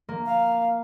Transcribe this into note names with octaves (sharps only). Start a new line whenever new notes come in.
A#3
F5